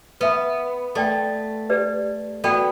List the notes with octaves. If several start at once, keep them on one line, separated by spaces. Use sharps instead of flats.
B3 B4 E5 B5
A3 A4 D5 G5
G4 B4 D5
B3 F#4 A4 D5 G5 B5